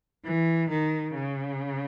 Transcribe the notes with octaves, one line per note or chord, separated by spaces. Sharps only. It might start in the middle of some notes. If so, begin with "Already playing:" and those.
E3
D#3
C#3